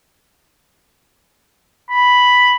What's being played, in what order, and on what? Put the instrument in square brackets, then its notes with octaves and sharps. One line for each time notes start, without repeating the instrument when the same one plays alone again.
[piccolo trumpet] B5